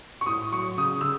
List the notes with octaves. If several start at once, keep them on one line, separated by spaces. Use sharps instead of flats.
C#6
A2 D#6
F#3 C#6
C#3 D#6
C#3 E6